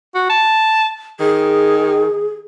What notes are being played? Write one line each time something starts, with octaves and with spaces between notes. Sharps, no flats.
F#4
A5
D#3 G#4